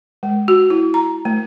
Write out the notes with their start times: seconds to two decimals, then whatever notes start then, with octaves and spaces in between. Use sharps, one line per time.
0.23 G#3
0.48 F#4
0.70 E4
0.94 A#5
1.25 A3